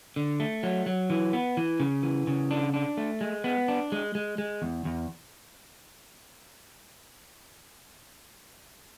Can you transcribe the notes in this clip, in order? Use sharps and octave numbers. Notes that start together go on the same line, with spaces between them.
D3
A3
F#3
F#3
E3
B3
E3
C#3
E3
C#3
D4
D4
A3
G#3
B3
D4
G#3
G#3
G#3
E2
E2